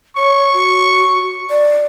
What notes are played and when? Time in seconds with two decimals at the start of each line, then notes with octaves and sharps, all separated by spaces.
0.17 C#5 C#6
0.54 F#4
1.50 D5